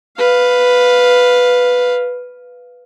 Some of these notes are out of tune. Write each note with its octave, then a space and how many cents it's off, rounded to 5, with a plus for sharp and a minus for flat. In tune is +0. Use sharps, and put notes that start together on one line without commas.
B4 +0 F5 +10